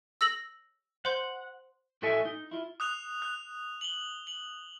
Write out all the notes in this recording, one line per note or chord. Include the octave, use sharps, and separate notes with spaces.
E6 A#6 F#7
C5 F#5 C6 G6
A2 F#4 A4 E5 G#5
D#4
E4 F4
D#6 F#6 F7
F#6
F#7 G7
F#7